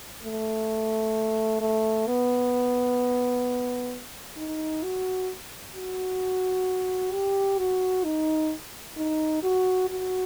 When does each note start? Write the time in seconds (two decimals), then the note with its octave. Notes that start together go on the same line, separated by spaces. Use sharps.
0.23 A3
1.61 A3
2.07 B3
4.37 D#4
4.83 F#4
5.75 F#4
7.13 G4
7.59 F#4
8.04 D#4
8.97 D#4
9.43 F#4
9.89 F#4